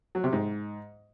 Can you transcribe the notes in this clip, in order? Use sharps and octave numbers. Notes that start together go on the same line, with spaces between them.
F#3
C3
G#2